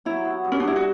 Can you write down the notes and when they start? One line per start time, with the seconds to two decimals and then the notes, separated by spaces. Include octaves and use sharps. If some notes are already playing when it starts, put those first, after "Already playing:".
0.05 F#3 E4
0.25 B3
0.45 G2
0.52 C#4
0.60 D4
0.63 G2 E4
0.76 F#4